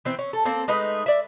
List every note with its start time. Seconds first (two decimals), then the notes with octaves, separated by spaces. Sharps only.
0.05 E3 C4
0.19 C#4
0.33 A4
0.45 A#3 C4 A4
0.68 G#3 A3 D#4 B4
1.06 D5 E5